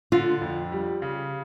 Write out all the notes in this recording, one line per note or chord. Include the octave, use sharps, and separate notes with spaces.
D3 F4
F2
G3
C#3